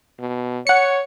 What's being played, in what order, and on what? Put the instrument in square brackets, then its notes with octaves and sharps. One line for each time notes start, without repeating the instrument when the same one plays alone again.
[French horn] B2
[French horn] C#5 [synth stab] F#5 C#7